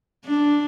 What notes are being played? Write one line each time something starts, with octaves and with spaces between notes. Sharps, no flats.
D4